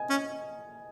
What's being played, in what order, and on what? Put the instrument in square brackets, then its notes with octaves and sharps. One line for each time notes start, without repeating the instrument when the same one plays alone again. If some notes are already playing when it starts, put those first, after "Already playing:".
Already playing: [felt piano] D#5 G#5
[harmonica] C#4